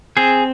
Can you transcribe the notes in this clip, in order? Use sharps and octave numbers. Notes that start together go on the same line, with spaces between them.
C4 G#4